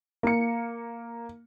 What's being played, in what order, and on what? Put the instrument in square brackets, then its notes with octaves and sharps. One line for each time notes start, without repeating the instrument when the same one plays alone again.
[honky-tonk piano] A#3 C#7